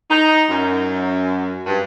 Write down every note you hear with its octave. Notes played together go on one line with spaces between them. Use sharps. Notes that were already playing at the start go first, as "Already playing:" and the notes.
D#4
F#2
G2